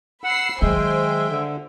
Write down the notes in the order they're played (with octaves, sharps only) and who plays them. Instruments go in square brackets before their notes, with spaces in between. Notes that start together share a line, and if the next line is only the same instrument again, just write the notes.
[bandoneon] F#5 [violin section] B5 E6 C7
[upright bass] D#3 F#3 [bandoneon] G#3 [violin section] C5 G5 G#5 [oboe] E5
[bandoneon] D3